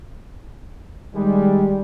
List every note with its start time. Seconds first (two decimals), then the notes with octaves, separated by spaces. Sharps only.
1.15 D#3 G3 G#3